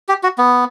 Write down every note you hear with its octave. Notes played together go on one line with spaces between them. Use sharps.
G4
F#4
B3